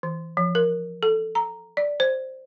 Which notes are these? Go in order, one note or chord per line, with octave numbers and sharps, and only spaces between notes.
E3
F3
A#4
A4
A#5
D5
C5